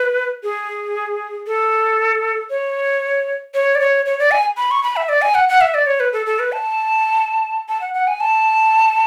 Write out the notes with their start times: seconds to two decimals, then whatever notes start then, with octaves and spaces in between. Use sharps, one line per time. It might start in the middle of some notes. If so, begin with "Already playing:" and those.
Already playing: B4
0.43 G#4
1.47 A4
2.50 C#5
3.54 C#5
3.75 D5
3.80 C#5
4.06 C#5
4.19 D5
4.31 G#5
4.57 B5
4.71 C#6
4.83 B5
4.96 E5
5.09 D5
5.22 G#5
5.35 F#5
5.49 F#5
5.61 E5
5.74 D5
5.86 C#5
6.00 B4
6.13 A4
6.26 A4
6.39 B4
6.52 A5
7.69 A5
7.81 F#5
7.94 F#5
8.07 G#5
8.20 A5